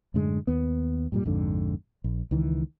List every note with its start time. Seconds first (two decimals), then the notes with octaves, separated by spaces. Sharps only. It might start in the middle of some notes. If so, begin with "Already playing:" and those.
0.14 F#2 A2 D3 G#3
0.47 D#2 B3
1.12 G2 A#2 G3
1.25 A#1 F2 G#2 D3
2.04 A#1
2.31 C#2 D#3 E3